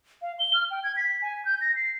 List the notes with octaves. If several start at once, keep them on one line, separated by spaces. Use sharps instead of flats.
F5
G7
F6
G5
G#6
B6
G#5
G6
A#6
C7